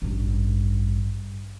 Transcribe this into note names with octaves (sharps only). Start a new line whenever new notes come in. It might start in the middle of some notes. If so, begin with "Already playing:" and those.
A1 G2